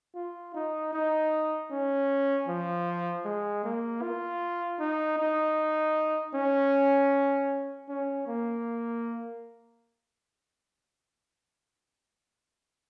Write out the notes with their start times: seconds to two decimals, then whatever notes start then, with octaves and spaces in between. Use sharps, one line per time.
0.15 F4
0.54 D#4
0.93 D#4
1.71 C#4
2.48 F3
3.25 G#3
3.64 A#3
4.02 F4
4.80 D#4
5.18 D#4
6.35 C#4
7.89 C#4
8.27 A#3